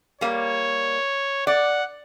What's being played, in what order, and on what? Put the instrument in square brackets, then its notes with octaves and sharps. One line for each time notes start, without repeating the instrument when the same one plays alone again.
[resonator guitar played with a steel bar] G3 A#3 [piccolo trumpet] C#5
[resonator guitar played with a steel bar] D5 [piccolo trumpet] F#5